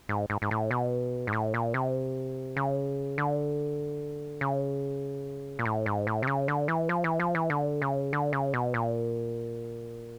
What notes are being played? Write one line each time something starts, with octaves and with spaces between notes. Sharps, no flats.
G#2
G#2
G#2
A2
B2
G#2
A2
A#2
C3
C#3
D3
C#3
A#2
A2
G#2
A2
C3
C#3
D3
E3
F3
E3
F3
E3
D3
C#3
D3
C#3
B2
A#2